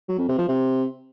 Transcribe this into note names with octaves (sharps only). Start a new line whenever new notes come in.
F#3
F2
C3
F3
C3